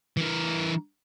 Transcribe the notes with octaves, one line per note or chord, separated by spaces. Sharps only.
E3 A#4